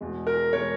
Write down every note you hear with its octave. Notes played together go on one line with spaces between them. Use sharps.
E2 B2 G#3
A#4
B2 G#3 A#4 C#5